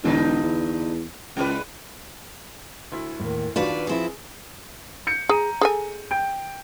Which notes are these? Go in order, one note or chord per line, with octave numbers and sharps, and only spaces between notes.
E1 G2 D3 D#4
E2
C#2 G#3 E4 B4
D2 E4
D#2 A2
D#2 D#3 D4 F4 F#4 B4 D5
F3 C4 E4 G#4
G6 C#7
G#4 A#5 D#7
G#4 A4 G#5
G5 G6 D7